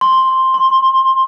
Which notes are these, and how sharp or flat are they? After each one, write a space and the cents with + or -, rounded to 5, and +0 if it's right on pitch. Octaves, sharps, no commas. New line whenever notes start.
C6 +5
C6 +20